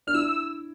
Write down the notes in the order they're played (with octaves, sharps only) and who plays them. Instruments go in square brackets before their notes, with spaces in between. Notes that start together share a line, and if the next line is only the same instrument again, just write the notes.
[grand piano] D4 [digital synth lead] F6
[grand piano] E4 [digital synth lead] E6